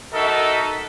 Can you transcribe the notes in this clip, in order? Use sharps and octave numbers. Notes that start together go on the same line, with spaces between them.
D#4 F#4 A4 A#4 D#5 E5